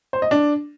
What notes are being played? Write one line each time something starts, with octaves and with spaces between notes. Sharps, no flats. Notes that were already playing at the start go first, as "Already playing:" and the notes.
C5
D#5
D4